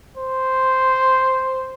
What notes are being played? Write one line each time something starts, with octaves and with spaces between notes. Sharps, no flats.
C5